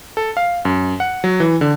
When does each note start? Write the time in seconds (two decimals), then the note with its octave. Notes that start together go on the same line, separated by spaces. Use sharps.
0.17 A4
0.37 F5
0.65 F#2
1.00 F#5
1.24 F#3
1.40 E3
1.61 D3